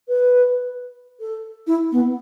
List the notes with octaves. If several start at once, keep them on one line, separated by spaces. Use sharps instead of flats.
B4
A4
E4
B3